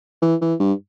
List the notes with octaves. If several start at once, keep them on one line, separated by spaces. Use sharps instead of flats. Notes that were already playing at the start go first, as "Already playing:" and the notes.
E3
E3
G2